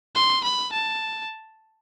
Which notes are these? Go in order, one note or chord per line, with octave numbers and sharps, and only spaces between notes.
C6
B5
A5